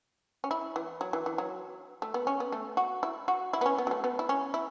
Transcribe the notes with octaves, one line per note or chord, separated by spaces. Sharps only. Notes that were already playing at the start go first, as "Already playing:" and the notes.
C#4
E4
E3
F#3
E3
E3
F#3
A3
B3
C#4
B3
A3
F#4
E4
F#4
E4
B3
C#4
B3
F#3
A3
B3
E4
C#4
E4